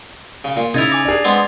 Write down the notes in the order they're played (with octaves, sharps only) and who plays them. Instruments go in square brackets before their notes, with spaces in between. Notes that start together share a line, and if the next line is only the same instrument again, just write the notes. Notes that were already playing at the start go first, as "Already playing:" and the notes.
[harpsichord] C#3
A#2
[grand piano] C#3 [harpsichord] D#4 E4 [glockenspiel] G#6 A6 F7
[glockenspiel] G#5 D6 A#6
[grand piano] D4 G#4
[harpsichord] G#3 B3 C4